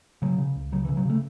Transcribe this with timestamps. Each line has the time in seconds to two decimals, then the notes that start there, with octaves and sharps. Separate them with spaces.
0.22 C#3 F#3
0.38 C#3
0.55 C#2
0.72 C#3 F#3
0.85 E3
0.89 C#3
0.97 F#3
1.06 C#3 A3